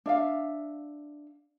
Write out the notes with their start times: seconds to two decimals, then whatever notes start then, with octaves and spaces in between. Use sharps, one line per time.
0.06 D4 E5 F5